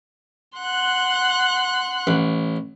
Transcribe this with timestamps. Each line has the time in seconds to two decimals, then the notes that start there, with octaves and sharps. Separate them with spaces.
0.57 F#5 C6 F#6
2.07 A1